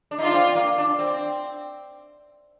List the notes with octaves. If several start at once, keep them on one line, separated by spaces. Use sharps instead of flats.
D4
D#4
D4 F4
C4
A#3
D4
C4